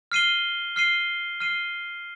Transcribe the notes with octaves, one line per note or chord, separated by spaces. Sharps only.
F6 C7 D#7 G7
F6 C7 D#7 G7
F6 C7 D#7 G7